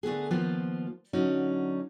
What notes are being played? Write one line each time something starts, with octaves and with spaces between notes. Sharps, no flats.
D3 A3 B3 G#4
D#2 F3 B3 F4 C5
D3 F#3 C#4 D#4